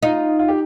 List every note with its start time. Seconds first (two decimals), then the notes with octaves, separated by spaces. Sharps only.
0.03 D#4 F4
0.39 F4
0.48 G4